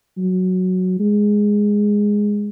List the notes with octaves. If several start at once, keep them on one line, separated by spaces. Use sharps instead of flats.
F#3
G#3